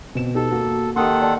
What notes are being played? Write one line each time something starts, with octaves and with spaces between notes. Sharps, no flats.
B2 C4 E7
D#4 G4 A4
A#3 F#4
D#3 A#3 G4 A4 F#5 C6 D#6
D5 A5 C6